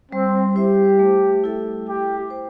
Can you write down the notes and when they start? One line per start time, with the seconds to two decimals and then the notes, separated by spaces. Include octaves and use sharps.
0.12 G3 C4
0.56 E4 G4 C5 E5
0.99 A3
1.44 E4 A4 E5
1.87 E4 G4
2.30 C5